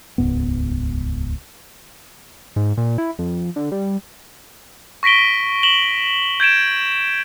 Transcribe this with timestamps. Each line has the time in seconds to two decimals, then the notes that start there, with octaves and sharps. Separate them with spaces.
0.18 D#1 C#2 G#2 B3
2.56 G#2
2.77 A#2
2.98 E4
3.19 F2
3.56 D3
3.72 G3
5.03 C#6 A#6 B6 D7 G7
5.63 E7 F#7 G7
6.40 G6 G#6 D7 E7